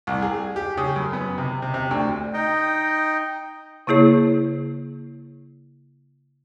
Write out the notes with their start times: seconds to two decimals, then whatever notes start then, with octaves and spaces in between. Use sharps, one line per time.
0.07 C2
0.22 G#4
0.56 G4
0.77 C#3
0.96 F#2
1.13 B3
1.38 C3
1.62 C3
1.74 C3
1.91 D2
2.34 D#4 D#5 G5
3.87 C#3 A#3 E4 G#4 C#5